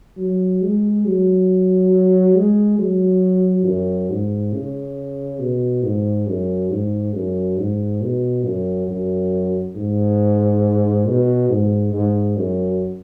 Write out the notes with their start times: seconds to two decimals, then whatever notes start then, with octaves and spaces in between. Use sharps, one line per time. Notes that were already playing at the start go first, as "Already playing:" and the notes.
0.17 F#3
0.61 G#3
1.05 F#3
2.35 G#3
2.78 F#3
3.65 F#2
4.09 G#2
4.52 C#3
5.39 B2
5.83 G#2
6.27 F#2
6.70 G#2
7.14 F#2
7.58 G#2
8.01 B2
8.44 F#2
8.87 F#2
9.75 G#2
11.06 B2
11.49 G#2
11.92 G#2
12.36 F#2